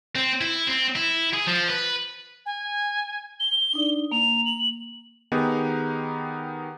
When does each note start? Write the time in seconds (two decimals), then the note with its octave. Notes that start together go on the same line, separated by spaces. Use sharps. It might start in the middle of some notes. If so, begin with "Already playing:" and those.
0.16 C4
0.41 E4
0.67 C4
0.96 E4
1.34 G#4
1.48 F3
1.69 B4
2.45 G#5
3.39 G7
3.73 D4 D#4 D5
4.11 A#3 F7
4.45 F#7
5.32 D#3 B3 D#4 G4 G#4